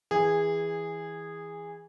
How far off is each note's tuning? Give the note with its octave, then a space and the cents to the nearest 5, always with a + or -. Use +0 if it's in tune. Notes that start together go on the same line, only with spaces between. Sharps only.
E3 -15 G#4 -15